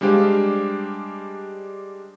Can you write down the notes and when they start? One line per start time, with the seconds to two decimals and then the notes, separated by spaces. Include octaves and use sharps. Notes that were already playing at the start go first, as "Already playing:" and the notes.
0.01 G3 G#3 D4 G4 C5 F5